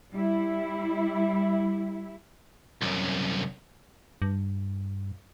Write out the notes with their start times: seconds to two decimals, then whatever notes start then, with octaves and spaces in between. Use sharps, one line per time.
0.11 G3 E4
2.82 C2 F#2
4.22 G2